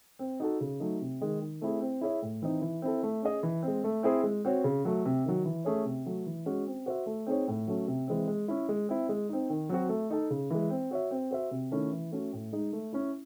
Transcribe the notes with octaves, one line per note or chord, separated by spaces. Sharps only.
C4
D#4 F#4 A4
C#3
F#3 A3 D#4
C3
D#3 G#3
D#3
A3 C4 E4 G#4
C4
E4 G#4 C#5 E5
A2
E3 C4 D#4
E3
C4 E4 A4
A3
C#4 G#4 D#5
E3
G#3 C4
A3
C4 E4 G#4 C5
G#3
C4 F#4 C#5
C#3
F#3 A3
C3
D#3 F#3
E3
A3 C#4 G#4 C#5
C3
F#3 A3
E3
G#3 C#4 F#4
C4
F#4 C5 E5
A3
C4 D#4 G#4 C#5
A2
F#3 A3 C#4
C3
E3 G#3 C4
G#3
C#4 E4
G#3
C4 E4
G#3
C4 D#4
D#3
F#3 C4 F#4
A3
D#4 A4
C#3
E3 G#3
C4
F#4 C#5 E5
C4
F#4 C5 E5
C3
D#3 A3 C#4 E4
E3
A3 C#4 F#4
A2
G#3 D#4
A3
C#4 E4